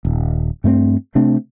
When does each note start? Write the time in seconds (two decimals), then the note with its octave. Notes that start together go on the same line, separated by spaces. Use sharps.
0.05 D#1
0.64 G2 A3 A#3 C4
1.15 C3 A3 C4 D4